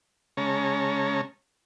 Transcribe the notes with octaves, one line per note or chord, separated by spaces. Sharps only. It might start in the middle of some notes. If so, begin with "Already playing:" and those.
C#3 G#3 C#4 C#5 A5 A#5